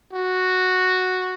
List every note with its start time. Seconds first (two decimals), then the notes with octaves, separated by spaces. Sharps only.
0.14 F#4